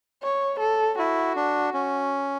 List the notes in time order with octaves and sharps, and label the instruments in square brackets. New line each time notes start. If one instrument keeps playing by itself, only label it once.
[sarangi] C#5
A4
[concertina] E4 [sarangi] F#4
[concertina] D4
C#4